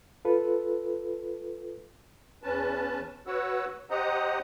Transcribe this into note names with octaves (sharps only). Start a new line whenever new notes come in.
F4 A4 B4
E2 C#4 B4 A5
F#4 B4 C#5 F#5 E6
G4 C5 D#5 F#5 A#5 D#6